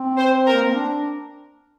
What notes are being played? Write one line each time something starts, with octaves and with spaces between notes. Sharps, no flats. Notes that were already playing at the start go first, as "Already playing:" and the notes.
Already playing: C4
C5
A#4
A#3
C4
D4